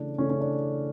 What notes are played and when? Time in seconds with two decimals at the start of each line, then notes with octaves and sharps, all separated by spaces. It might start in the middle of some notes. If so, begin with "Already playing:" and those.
Already playing: C#3 E3 A3 D4
0.18 C#3 E3 A3 C#4
0.30 C#4
0.41 D4